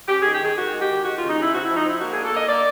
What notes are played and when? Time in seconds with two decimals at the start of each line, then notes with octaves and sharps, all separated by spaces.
0.08 C#4 G4
0.21 D#3 G#4
0.32 G4
0.41 D#3 G#4
0.57 D#3 F#4
0.72 G#3
0.81 G4
0.89 D#3
1.04 G#3 F#4
1.16 C#3 F4
1.28 D#4
1.37 C#3 E4
1.53 C4 F#4
1.64 F3 E4
1.76 D#4
1.83 C4 E4
2.00 A#3 F#4
2.12 D4 G#4
2.23 A4
2.31 A#3 D#5
2.47 A#3 D5